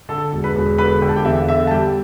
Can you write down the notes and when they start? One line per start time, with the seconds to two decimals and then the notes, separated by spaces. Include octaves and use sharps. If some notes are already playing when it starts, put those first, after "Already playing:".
0.09 D3 A4 A5
0.33 E1
0.44 B4 B5
0.56 E1
0.78 D3 B4 B5
1.02 D3 G5
1.09 A5
1.16 G4 G5
1.25 E2 E5
1.48 D3 E5
1.67 A5
1.71 G3 G4 G5